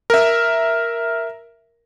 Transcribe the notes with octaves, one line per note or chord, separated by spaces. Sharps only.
A#4 E5